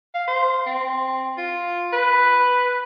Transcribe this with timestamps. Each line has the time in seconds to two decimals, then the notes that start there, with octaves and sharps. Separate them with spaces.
0.15 F5
0.27 C5
0.66 C4
1.37 F4
1.93 B4